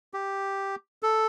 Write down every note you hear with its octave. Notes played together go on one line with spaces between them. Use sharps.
G4
A4